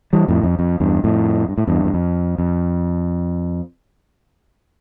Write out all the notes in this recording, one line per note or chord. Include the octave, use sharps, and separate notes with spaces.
E3 G3
F2 A2
F2
F2
E2 G2
F2 A2
G2
A2
E2 G2
E2
F2
F2